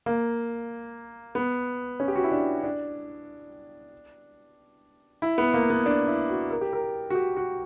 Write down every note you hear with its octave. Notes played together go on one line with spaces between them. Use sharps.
A#3
B3
C#4
G4
F#4
E4
D4
D4
E4
B3
A#3
B3
D4
E4
F#4
A#4
G4
A#4
F#4
G4
F#4